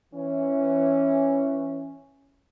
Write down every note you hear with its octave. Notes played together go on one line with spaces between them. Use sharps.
E3 C#4